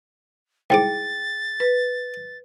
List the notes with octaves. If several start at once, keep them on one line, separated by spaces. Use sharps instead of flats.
C2 G#2 G#4 G5 D6 A6
B4